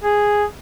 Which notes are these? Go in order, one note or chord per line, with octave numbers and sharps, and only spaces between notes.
G#4